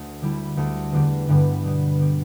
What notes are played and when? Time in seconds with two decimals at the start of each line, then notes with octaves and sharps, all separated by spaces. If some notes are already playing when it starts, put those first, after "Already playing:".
Already playing: D2 A3 D4 A4
0.21 D3 G3 E4
0.57 D2 D3 A3 G4
0.92 E2 D3 A3 G4
1.29 G2 D3 G3 B3
1.63 B2 G3 B3
1.99 D3 B3 G4